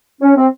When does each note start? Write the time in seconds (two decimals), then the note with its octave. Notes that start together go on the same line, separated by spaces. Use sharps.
0.22 C#4
0.36 C4